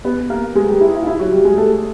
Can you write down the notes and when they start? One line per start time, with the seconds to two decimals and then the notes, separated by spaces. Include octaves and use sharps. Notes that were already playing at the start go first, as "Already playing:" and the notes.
0.05 B3 B4
0.30 A#3 A#4
0.55 G#3 G#4
0.68 G3 G4
0.81 E4
0.94 E4
1.03 F4
1.07 E4
1.19 F#3 F#4
1.32 G3 G4
1.45 G#3 G#4
1.58 A3 A4